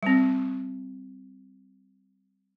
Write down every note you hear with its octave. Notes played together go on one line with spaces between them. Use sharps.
G3 C4